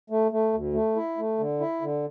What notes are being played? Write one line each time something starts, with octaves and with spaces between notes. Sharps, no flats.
A3
A3
D2
A3
E4
A3
D3
E4
D3